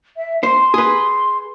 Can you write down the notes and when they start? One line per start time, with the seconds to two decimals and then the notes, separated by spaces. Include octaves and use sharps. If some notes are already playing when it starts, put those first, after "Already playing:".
0.17 E5
0.43 C5 C6
0.74 G#4 B4